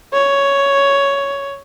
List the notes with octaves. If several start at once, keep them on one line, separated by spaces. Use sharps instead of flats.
C#5